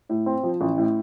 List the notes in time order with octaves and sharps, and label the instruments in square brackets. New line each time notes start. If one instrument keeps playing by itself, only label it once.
[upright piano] A2
C4
F3
A1
A2